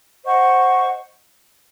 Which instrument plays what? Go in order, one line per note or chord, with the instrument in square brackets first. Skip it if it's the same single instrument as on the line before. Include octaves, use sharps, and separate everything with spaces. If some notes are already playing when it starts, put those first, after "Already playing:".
[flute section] C5 D#5 F#5 C#6